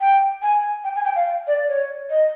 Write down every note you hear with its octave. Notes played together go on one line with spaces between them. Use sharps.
G5
G#5
G5
G#5
G5
F5
D5
C#5
D#5